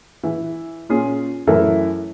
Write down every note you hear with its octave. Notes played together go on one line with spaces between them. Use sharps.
E3
A#2 C#4 F4 G#4
F#2 E3 A3 E4 A4 A#4